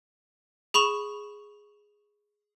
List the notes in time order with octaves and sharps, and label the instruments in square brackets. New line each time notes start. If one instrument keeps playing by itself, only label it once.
[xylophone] G#4 B5 C#6 E7